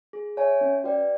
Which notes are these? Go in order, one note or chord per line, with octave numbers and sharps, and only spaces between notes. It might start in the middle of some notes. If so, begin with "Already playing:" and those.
G#4
C#5 E5 G#5
C#4
F#4 B4 D5 G5